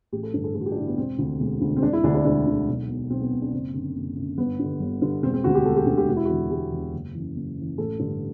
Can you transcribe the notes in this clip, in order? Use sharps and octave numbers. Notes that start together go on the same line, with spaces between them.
A1 G4
A4
G2 D3
A4
A1 A4
F#4
G4
D4
G2 D3 E4
B3
E1 C4
D2 D3
E1
D2 D3
C4
E1 D4
E4
D2 D3 D4
D4
E4
E1 D4
D2 D3
B1
B2
B1 C4
B3
B2
D4
F#1 C4
F#2 D3
F#1
F#2 D3
G1 B3
G2 D3
G1
G2 D3
E1 C4
C4
D2 D3 F#4
G4
E1 A4
G4
D2 D3 A4
G4
E1 F#4
E4
F#4
E2 D3
E1 G4
E2 D3
F#1
F#2 E3
F#1
F#2 E3
A1 A4
G2 D3